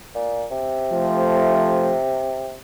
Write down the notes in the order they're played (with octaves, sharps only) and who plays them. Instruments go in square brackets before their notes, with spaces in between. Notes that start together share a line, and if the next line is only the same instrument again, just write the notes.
[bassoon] A#2
C3
[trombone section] F3 A3